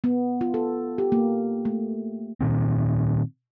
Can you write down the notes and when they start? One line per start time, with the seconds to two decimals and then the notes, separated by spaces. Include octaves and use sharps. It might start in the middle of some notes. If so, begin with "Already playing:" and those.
0.04 B3
0.41 F4
0.54 A4
0.98 G4
1.12 A#3
1.65 A3
2.41 A#2 D#3 C4